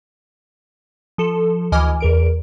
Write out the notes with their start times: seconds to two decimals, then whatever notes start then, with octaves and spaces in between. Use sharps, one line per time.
1.18 F3 A4
1.72 D2 E3 D#5 G#5 D6 F6
2.00 E2 A#4 D7